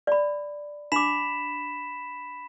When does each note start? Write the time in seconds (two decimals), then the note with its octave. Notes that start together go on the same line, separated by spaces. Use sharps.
0.07 D5 B5
0.92 D4 B5 D6 B6 E7